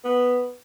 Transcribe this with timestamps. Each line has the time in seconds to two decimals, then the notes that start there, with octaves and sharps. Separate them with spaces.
0.05 B3